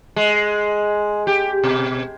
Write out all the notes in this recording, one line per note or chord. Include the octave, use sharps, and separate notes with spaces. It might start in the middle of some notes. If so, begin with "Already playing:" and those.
G#3
G4
B2